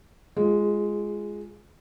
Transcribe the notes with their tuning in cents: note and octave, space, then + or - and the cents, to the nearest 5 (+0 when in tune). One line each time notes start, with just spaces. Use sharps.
G#3 +0 F4 +0 G#4 -30